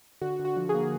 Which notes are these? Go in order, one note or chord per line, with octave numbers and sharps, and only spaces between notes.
D3 F#4
D3
F#4
F3
G#4
A#3